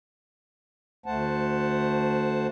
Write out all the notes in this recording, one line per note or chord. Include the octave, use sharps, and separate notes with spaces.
D2 A3 C5 F#5 A5